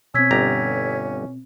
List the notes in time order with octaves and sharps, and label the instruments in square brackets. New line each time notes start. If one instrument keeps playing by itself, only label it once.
[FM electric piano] B2 C4 [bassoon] C#4 [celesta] E6 G#6 B6
[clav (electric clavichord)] G1 G4 A#5